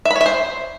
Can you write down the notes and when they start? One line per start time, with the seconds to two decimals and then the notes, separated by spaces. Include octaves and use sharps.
0.05 E5
0.11 B5
0.16 C#5
0.21 E5
0.26 C5